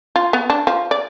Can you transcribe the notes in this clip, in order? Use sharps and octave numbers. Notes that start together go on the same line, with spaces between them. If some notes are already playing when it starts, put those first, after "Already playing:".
F4
B3
D4
F3
D5